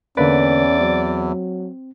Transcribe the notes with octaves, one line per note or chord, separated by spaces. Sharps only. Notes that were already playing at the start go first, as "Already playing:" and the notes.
E2 D3 A#3 C#4 B4 D5
F#3 C4